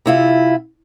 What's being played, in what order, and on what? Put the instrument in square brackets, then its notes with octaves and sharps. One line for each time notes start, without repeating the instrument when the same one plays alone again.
[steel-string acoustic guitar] C3 E4 F4